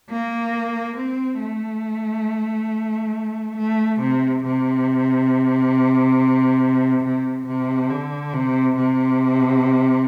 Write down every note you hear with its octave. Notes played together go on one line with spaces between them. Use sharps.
A#3
C4
A3
A3
C3
C3
C3
C3
D3
C3
C3